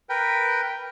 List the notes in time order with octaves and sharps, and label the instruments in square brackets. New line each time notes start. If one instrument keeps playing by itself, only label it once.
[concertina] A#4 B4 G5